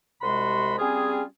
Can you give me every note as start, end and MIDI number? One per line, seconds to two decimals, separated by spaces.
0.22 0.76 36
0.22 0.76 48
0.22 0.76 56
0.22 0.76 66
0.22 0.76 83
0.22 0.76 84
0.78 1.22 55
0.78 1.22 60
0.78 1.22 61
0.78 1.22 65
0.78 1.22 68